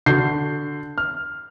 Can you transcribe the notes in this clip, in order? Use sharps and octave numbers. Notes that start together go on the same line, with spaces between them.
D3 F#4 G6 C7
F6